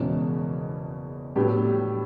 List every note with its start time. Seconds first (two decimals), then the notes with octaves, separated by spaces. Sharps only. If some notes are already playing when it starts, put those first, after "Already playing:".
Already playing: F#1 E2 B2 G#3 C#4
1.36 A2 F#3 B3 D4 G4